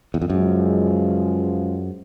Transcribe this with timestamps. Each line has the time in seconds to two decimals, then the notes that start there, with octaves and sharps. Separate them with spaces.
0.14 E2
0.22 F2
0.30 C#2 F#2 C#3 F3 G#3